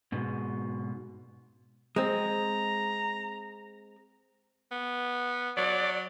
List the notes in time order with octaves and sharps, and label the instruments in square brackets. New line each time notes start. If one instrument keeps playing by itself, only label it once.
[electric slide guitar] G#2 B2
[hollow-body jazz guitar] G#3 C4 [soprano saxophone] A#5
[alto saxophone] B3
[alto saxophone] F#3 [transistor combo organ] D5